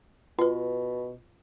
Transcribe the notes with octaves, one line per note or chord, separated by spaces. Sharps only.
B2 F4 B4